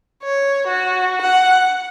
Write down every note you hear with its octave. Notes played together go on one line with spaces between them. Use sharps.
C#5
F#4
F#5